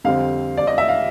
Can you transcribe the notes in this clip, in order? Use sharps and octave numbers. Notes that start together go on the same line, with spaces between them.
F2 D3 G3 C4 F5
D5
D#5
E5
F5